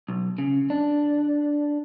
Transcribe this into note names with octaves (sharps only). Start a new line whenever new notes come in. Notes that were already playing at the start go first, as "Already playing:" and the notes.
B1
C#3
D4